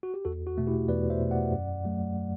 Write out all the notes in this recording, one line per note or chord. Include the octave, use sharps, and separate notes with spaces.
F#4
G4
E2 F#4 A4
F#4
B2 A3
E4 G4
E2 B4 D5
C5 E5
B2
A3
D5 F#5
F#2
F#3 A3